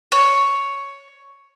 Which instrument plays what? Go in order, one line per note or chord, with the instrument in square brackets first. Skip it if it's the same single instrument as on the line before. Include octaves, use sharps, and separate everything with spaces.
[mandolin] C#5